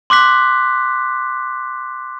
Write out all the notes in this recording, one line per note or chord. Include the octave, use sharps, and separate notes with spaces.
C6 D6 F#6 B6